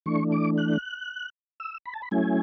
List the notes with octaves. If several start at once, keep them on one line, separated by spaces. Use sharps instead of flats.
E3 A3 D4 C#6
D6
F#6
E6
B5
A5
B5
F#3 A3 C#4 E4 G#5